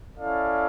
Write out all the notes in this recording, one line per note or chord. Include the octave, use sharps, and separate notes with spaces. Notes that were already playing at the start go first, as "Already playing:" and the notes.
C#4 E4 A4 D5 F5